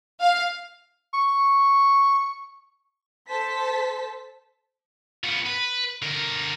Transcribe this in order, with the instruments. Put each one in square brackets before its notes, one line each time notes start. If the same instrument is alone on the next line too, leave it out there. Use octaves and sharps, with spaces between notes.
[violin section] F5
[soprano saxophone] C#6
[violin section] A4 C5 A5 B6
[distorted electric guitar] F3 B3
B4
D3 A#4